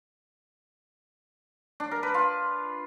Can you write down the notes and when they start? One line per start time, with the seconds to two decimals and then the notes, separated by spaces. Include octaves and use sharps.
1.80 D4
1.91 A#4
2.03 B4
2.14 F4